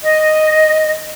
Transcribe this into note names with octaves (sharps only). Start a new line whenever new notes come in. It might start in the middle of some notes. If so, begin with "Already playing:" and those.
D#5